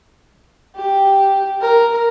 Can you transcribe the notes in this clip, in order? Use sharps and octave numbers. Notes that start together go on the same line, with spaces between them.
G4
A#4